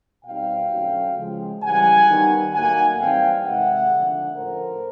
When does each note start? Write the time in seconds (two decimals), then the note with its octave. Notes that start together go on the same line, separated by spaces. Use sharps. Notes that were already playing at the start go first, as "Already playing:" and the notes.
0.26 B2 G3 C4 D#4 F5 G5
0.72 D3 F#3 A3 C#4
1.17 C#3 F3 G#3
1.62 C#3 E3 G3 F#5 G#5
2.09 D#3 G3 B3 D#4
2.54 A2 F#3 A#3 D#4 F#5 G#5
3.00 E3 G3 C4 D#4 F5 G5
3.46 C3 D#3 G#3 E5 F#5
3.91 D3 F3 A3 D4
4.36 A2 F3 A3 C#4 A#4 C5